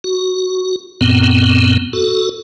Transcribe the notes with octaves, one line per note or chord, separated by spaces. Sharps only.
F#4
F#2 A#2 B3 C4
F#4 A4